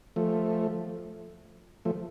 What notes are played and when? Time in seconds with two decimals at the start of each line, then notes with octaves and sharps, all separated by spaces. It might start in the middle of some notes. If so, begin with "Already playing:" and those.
0.16 F3 A3
1.85 F3 A3